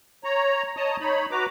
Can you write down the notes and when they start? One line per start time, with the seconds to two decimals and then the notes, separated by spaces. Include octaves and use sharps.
0.24 C#5 A#5
0.77 C#5 D#5 A5 A#5 D#6
1.00 D#4 C#5 B5
1.31 F#4 B4 A#5 D6